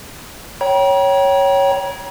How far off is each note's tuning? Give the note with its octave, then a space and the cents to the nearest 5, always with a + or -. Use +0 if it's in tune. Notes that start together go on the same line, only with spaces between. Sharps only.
C#5 +0 G5 -20 A#5 +45